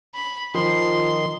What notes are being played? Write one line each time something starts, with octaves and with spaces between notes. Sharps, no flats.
B5
D#3 F3 C6